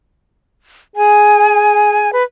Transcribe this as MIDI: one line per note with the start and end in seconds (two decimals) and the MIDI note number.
0.96 2.20 68
0.96 2.11 80
2.13 2.23 71